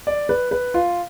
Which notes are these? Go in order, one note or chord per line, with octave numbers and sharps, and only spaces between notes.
D5
B4
B4
F4